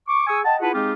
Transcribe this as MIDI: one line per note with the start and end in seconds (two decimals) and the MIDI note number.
0.08 0.27 85
0.08 0.27 86
0.27 0.39 68
0.27 0.39 80
0.27 0.39 85
0.27 0.39 87
0.27 0.39 88
0.44 0.55 75
0.44 0.55 78
0.44 0.55 79
0.44 0.55 81
0.60 0.71 64
0.60 0.71 65
0.60 0.71 68
0.60 0.71 71
0.60 0.71 78
0.60 0.71 81
0.73 0.92 56
0.73 0.92 60
0.73 0.92 63
0.73 0.92 65
0.73 0.92 67
0.73 0.92 68